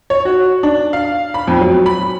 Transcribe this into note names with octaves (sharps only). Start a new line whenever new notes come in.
C#5
F#4
D4
F5
B5
F2
F#3
B5